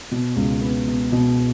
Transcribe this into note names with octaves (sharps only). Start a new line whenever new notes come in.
B2
C#2
B3
B2
B2